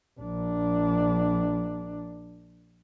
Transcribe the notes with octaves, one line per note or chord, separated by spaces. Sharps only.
A#1 D4